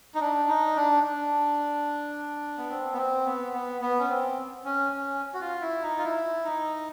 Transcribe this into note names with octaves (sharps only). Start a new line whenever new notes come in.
D#4
D4
D#4
D4
D4
B3
C4
B3
C4
B3
B3
B3
C#4
C4
C#4
C#4
F#4
F4
E4
D#4
F4
E4
D#4